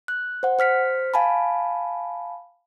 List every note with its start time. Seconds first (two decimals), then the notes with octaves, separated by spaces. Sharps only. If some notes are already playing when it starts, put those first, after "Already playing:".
0.08 F#6
0.43 C5 F#5
0.59 C5 F6 B6 C#7
1.14 F5 G#5 A5 B5